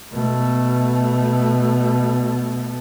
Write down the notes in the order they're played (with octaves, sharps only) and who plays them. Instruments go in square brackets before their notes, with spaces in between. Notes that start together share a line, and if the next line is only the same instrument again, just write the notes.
[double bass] B2 A3